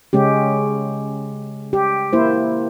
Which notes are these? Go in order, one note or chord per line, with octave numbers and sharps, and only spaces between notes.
C#3 G#3 C#4 G4
G4
A#3 E4 C5